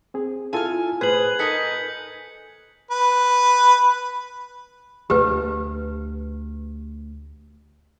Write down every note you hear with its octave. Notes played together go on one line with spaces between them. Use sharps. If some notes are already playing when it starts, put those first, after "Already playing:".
C4 G#4
E4 F4 A4 G#5 F6
A2 G#4 B4 C5 G#6 F#7
D#4 A4 A#4 G#5 G6 B6 C#7
B4
D2 G4 B4